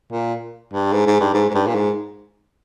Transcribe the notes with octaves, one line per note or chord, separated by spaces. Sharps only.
A#2
G2
G#2
G#2
G2
G#2
G#2
G2
A#2
G#2